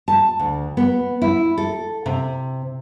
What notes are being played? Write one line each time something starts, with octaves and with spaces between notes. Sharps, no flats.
A5
D2
B3
E4
A4
C3